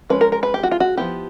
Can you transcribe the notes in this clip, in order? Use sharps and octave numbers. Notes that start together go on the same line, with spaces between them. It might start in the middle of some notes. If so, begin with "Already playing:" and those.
F3 G#3 C#4 B4
A#4
A#4
B4
G4
F#4
F4
F#4
F3 G#3 B3 E4 G4